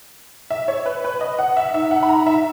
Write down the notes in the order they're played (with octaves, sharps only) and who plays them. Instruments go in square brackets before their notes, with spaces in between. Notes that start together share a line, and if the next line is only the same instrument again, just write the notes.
[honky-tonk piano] E5
C#5
B4
B4
D#5
F#5
E5
[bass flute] D#4 [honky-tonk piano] E5
[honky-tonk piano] F#5
B5
A#5
E5